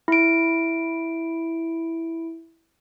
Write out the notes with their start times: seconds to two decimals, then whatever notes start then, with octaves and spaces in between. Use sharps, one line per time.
0.08 E4 D7